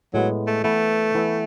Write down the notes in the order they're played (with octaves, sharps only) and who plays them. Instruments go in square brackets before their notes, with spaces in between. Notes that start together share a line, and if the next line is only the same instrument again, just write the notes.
[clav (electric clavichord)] A2 G#3 B3 [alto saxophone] F#3
[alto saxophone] A3
[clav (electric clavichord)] E3 B3 E4 B4 E5 [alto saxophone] A3
[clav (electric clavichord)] E3 B3 E4 B4 E5